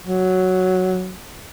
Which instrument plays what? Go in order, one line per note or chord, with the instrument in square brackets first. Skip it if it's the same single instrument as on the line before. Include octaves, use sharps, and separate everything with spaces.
[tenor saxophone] F#3